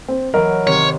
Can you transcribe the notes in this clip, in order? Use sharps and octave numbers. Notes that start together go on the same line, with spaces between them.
C4
E3 F#3 A#4 D#5
C3 D#3 C#5